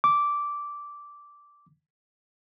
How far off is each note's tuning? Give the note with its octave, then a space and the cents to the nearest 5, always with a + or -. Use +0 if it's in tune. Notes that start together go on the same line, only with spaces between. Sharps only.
D6 -10